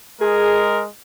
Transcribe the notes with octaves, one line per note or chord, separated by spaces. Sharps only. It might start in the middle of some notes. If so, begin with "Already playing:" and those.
G#3 G#4 A#4